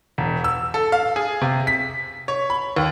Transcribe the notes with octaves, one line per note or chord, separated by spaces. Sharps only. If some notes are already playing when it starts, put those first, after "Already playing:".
E1
E6
A4
F5
G#4
C3
B6
C#5
B5
D#2